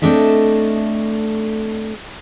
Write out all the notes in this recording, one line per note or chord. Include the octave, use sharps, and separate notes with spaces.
A3 C4 D4 A4 D#5 E5